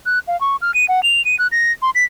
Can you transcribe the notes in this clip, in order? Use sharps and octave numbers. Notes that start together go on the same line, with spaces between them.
F#6
F5
C#6
F6
D#7
F#5
F7
D#7
F#6
A#6
C6
B6